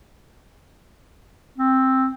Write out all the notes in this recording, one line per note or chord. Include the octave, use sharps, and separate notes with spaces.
C4